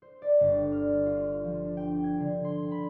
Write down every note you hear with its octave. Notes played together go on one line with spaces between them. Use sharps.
C5
D5
G1
F6
F4
F3
D4
G5
G#6
D3
C6
B5